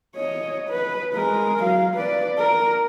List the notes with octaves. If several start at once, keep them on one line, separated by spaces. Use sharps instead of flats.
C#5 D#5
B4
G#3 A#4
F#3 F5
B4 D5
A#4